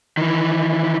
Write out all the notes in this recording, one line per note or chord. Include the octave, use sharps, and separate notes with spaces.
D#3 E3